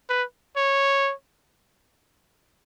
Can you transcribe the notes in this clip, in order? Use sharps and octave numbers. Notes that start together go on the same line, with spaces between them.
B4
C#5